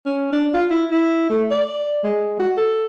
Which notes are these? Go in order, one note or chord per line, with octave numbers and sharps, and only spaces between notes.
C#4
D4
F4
E4
E4
A3
D5
G#3
F#4
A4